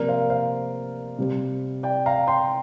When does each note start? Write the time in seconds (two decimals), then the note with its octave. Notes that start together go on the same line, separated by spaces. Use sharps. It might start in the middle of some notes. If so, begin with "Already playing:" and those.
Already playing: C3 F3 A#3 A#4 D5
0.08 C5 F5
0.30 C5 F5
1.18 C3 G3 C4
1.83 D5 G5
2.06 F5 A#5
2.27 G5 C6